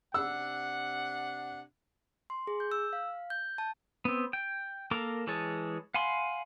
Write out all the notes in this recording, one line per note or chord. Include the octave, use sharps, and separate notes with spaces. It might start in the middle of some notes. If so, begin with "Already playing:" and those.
C3 D4 F#5 E6
C6
G#4
G6
E6
F5
G6
A5
B3 C4
G5
A#3 A4 A#4 A#5 D6
E3 G#3 G#4 C#5 A5
F5 F#5 G#5 B5 C6